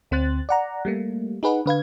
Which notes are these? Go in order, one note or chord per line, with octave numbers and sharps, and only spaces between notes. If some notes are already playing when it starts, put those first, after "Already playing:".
D2 C4 C5 F#6 A6
D5 F#5 A#5
G3 A3 A#3
D#4 G#4 B4 F#5
D3 B4 F5 G#6